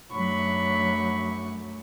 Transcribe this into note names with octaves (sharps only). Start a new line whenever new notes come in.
F#2 F#3 A3 D4 B5 C#6